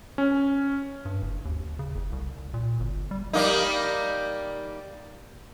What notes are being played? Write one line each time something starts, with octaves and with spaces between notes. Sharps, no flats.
C#4
G2
F#1
D#2
C#3
F#1
C2
A#2
G1
G3
G3 A#3 D#4